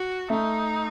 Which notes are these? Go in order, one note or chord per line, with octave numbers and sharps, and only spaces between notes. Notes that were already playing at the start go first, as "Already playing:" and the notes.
Already playing: F#4
A3 D#4